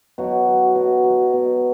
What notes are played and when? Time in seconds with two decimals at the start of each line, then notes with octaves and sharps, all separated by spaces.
0.18 B2 F#3 F#4
0.48 F#3
0.75 B2
1.04 F#3
1.33 B2